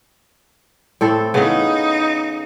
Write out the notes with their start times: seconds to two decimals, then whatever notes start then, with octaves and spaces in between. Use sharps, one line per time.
1.01 A2 C4 A4
1.34 C#3 B3 D#4